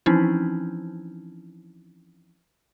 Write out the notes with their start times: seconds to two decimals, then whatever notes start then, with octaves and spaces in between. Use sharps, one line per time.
0.06 E3 F3 C4 C#4 D#4 E4